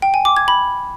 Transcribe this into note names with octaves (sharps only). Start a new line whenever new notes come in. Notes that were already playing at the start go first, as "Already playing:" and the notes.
G5
G#5
D6
G#6
B5